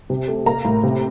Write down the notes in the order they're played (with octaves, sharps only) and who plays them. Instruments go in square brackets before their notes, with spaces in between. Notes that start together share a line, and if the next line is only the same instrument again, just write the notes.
[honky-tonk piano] C3
A3
A#3 A#5
A2
C3